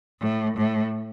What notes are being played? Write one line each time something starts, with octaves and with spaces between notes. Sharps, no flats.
A2
A2